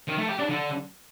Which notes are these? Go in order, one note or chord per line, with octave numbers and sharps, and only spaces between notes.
D#3
A3
G4
D4
D3